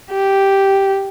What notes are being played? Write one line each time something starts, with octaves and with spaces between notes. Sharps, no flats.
G4